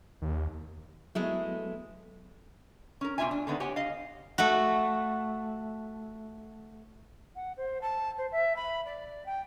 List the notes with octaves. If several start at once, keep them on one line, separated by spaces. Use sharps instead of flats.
D#2
F#3 G#3 A3 B3 E4
C#4 A#4
B2 A#3 D4 F4 E5 G#5
D4
D3 D#3 B3 C4
G4 C#5 F#5 G#5
D#5 F5
A3 F#4
F#5
C5
A5
C5
E5
B5
D5
G5